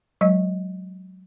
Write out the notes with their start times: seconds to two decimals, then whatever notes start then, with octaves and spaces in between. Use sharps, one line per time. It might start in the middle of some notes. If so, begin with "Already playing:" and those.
0.21 F#3 G#3 D#5